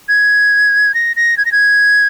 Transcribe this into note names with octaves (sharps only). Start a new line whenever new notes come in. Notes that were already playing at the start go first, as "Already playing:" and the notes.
G#6
A#6
A#6
G#6
A#6
G#6